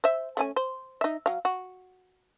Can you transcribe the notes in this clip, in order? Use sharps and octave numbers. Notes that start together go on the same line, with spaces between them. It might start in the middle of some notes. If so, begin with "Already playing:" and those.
C5 E5
A3 C#4 G#5
C5
D#4 E5
F#3 F5
F#4